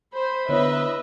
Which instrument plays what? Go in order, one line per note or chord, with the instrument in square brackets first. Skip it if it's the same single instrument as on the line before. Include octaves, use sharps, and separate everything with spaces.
[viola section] C5 [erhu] B5
[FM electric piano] D3 B3 E4 [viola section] B4 D#5 E5 [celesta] C#5